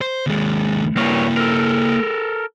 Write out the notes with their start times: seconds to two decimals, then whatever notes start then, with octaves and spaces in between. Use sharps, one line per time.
0.01 C5
0.27 D#2 G#3
0.97 G2 A#3 E4 A#4 C#5
1.37 A4 A#4